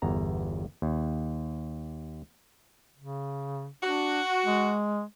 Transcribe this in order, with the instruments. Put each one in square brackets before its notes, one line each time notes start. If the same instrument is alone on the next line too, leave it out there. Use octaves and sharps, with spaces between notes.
[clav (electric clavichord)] G1 E2 A#5
D#2
[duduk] C#3
[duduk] D4 [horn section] F#4
[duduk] G#3